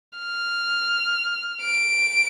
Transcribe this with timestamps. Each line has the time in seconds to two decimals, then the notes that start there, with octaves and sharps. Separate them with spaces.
0.19 F6
1.63 D7